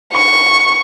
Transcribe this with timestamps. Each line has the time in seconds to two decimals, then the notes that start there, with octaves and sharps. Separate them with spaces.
0.13 C#6